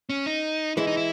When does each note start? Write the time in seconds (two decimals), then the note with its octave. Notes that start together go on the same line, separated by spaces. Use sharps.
0.09 C#4
0.26 D#4
0.77 E3 G#3 E4
0.87 D#4
0.97 E4